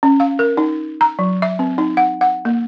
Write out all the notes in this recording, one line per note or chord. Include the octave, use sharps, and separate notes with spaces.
C#4
F5
A#4
D#4
A#5
F#3
E5
C4
D#4
F#5
F#5
A#3